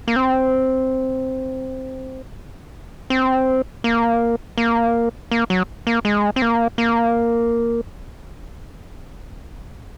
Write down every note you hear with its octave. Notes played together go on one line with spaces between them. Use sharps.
A#3
C4
C4
A#3
A#3
A#3
F#3
A#3
G#3
C4
A#3
A#3